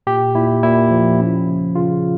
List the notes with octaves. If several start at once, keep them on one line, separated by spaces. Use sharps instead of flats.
A#2 G4
A#2 E4
A#2 E4
F3
C#4
C#3
C#3 F4